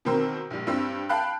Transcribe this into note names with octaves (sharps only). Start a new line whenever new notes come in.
B2 D#3 C4 A#4 E6
A#1 G3
G2 G3 C4 E6
F5 G5 A5 B5 F#6